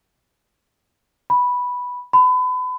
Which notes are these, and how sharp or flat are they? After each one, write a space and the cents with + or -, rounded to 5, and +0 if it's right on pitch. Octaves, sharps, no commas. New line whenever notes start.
B5 -5
B5 +30